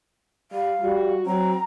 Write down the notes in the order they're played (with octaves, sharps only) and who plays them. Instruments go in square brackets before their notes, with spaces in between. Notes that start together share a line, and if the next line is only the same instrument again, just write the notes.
[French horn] G3 [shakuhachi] F5
[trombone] G3 [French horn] F#4
[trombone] F#3 [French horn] C4 [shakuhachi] A#5